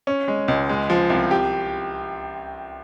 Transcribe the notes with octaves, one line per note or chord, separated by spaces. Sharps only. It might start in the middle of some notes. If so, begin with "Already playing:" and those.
C#4
G#3
C#2
G#3
F3
C2
G4